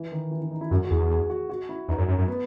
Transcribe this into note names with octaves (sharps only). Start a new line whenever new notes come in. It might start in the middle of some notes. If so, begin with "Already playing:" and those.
Already playing: E3
D#3
E3
E3
D#4
E4
F#2 F#4
F#4
E2 G#4
G#4
F#4
F#4
E4
E2 D#4
F#2
F#2
F#2
B3